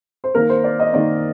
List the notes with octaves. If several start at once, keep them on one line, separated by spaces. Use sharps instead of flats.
C5
D#3 A#3 A#4
C5
D5
D#5
D#3 A#3 D5